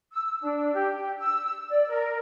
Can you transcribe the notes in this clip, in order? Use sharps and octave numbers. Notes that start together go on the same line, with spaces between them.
E6
D4
G4
E6
D5
A#4